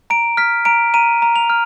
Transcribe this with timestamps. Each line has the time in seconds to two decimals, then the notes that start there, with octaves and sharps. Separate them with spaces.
0.10 A#5 D7
0.37 F6 B6
0.65 A#5 D7
0.94 A#5 D#7
1.22 A#5
1.36 F7
1.50 F6